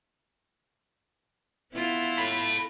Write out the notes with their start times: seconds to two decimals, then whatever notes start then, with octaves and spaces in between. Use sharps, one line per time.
1.73 B3 E4 F4
2.18 A4 B5